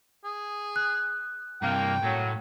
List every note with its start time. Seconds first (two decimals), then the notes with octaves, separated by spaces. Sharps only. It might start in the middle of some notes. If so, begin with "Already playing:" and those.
0.24 G#4
0.76 F#6
1.62 G2 C3 A#3 G5
2.03 A2 F#3